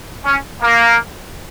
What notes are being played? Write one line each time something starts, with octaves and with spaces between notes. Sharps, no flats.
C#4
A#3